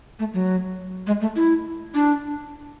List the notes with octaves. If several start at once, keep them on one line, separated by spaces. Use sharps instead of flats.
A3
F#3
G#3
A3
E4
D4